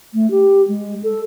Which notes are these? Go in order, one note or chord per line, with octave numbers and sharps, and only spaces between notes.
A3
G4
G#3
A4